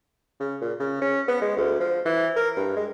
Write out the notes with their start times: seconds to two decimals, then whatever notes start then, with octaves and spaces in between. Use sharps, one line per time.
0.40 C#3
0.61 A#2
0.80 C#3
1.01 C#4
1.28 B3
1.41 G#3
1.57 D2
1.80 F3
2.05 E3
2.36 A#4
2.57 G2
2.76 G#3